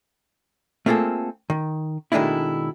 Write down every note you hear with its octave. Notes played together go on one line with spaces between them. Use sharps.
A3 A#3 C4 F4 G#4 A4
D#3
B2 D#3 G#3 A3 D4 E4